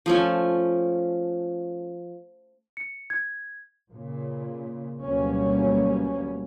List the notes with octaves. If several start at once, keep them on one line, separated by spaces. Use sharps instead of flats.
F3 A3 C#4
C#7
G#6
A#2 C#3
D2 B2 F#3 G3 A#3 C#4